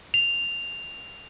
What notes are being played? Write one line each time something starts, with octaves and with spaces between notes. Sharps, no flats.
F7